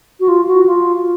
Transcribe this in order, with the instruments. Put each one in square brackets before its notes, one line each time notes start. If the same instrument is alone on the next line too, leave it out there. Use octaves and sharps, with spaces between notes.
[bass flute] F#4
F4
F#4
F4